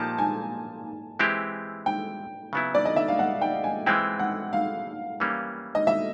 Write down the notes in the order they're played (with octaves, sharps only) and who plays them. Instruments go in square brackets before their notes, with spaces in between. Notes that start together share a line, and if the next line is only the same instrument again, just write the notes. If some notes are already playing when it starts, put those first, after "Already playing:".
Already playing: [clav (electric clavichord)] A#2 F3 A#3 D#4 G4 [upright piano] A5
[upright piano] G#5
[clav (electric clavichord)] E3 G#3 C4 E4 G4
[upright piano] G5
[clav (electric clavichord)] C#3 F#3 B3 E4
[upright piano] D5
D#5
E5
F5
F#5
G5
G#5
[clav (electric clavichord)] E3 G#3 C4 E4 [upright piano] G5
[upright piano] F#5
F5
[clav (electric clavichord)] E3 G3 A#3 C#4
[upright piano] D#5
E5